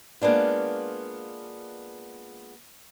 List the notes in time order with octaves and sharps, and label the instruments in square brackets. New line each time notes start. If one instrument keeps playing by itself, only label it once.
[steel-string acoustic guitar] G#3 A#3 B3 D4 F4